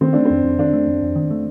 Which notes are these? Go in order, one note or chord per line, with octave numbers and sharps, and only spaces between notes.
D#3 C4
A3 D4
F2 C4
F2
D#3 D4
A3
F2
F2
D#3
A3